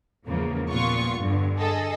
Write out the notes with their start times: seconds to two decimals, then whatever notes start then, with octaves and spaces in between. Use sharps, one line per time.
0.27 E2 G#2 C#3 F3 A#3
0.70 A#2 G3 B3 F4 C#6
1.17 G2 D3
1.58 G#4 A4 D#5